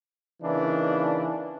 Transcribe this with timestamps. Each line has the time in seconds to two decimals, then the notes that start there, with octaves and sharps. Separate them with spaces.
0.43 C#3 E3 A#3 D4 D#4